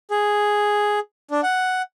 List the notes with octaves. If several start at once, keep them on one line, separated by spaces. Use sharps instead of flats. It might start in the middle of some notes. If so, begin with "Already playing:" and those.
G#4
D4
F#5